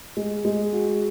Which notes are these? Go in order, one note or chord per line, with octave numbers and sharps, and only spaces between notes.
G#3
G#3
F#4